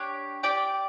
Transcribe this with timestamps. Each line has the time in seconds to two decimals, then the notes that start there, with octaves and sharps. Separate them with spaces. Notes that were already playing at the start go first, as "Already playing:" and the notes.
Already playing: D4 G4 C#5 G5
0.43 G4 D5 G5